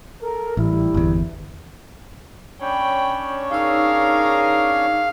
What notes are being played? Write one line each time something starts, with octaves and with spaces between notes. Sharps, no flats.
A4 A#4
A1 G3 E4
G1 E2
C#4 D4 C#5 G5 B5
D#4 G#4 A#4 F5 E6